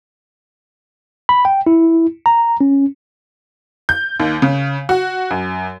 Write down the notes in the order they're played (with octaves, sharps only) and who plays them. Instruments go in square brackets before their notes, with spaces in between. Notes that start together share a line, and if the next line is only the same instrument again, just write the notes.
[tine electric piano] B5
G5
E4
A#5
C#4
[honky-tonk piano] G6
D#2
C#3
F#4
F#2